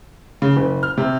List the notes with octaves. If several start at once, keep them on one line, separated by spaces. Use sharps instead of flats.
C#3
F#1
F6
C3